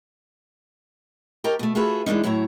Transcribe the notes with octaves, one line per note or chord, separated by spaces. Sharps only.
G4 A4 A#4 C#5 D#5 A#5
B2 A3
F4 F#4 G#4 A4 B4 E5
E3 G#3 A#3 D4 D#4
A2 F#3 E4 C#5 A#5